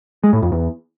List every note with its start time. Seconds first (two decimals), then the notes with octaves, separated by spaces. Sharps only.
0.24 G#3
0.33 A2
0.43 F2
0.52 E2